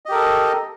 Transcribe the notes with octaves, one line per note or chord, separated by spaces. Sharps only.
G4 A4 A#4 D#5